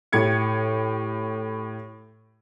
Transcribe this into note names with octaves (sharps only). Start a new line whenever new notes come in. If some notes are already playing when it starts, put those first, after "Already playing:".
A2 G4 G#6 C#7